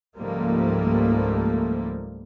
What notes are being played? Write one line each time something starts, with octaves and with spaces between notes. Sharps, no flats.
C#2 G#2 F3 G3 A3 A#3